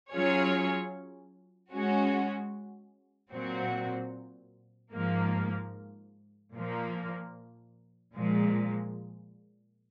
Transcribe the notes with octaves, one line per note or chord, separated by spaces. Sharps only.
F#3 C#4 F4 G#4 C#5
G#3 C#4 F#4
A#2 F#3 C4 F#4
G#2 F3 A#3
A#2 F3 A#3
A#2 F3 G#3